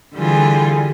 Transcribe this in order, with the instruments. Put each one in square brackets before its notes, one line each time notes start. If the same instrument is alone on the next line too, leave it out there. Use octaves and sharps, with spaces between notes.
[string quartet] D3 E3 G3 F4 G#4